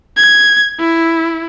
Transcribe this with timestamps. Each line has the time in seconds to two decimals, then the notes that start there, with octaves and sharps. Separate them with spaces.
0.17 G#6
0.80 E4